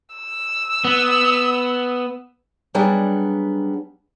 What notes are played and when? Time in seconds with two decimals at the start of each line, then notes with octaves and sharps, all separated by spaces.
0.15 E6
0.85 B3
2.75 F#3 G3 B3 D4 G#4